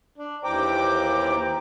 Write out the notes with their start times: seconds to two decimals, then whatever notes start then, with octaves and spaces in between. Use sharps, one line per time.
0.18 D4
0.44 D#2 E3 C5 G5 A#5 D6